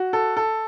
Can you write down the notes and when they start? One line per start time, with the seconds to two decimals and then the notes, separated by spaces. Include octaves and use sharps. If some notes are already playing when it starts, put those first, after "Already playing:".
Already playing: F#4
0.13 A4
0.37 A4